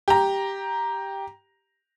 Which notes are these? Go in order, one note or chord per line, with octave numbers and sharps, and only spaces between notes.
G4 A#5